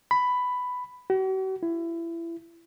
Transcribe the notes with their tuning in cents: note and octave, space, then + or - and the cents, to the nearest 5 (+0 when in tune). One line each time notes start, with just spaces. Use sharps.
B5 +10
F#4 +45
E4 +25